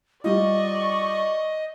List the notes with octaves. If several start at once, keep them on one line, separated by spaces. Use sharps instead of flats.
G3 F4 D5 D#5 C#6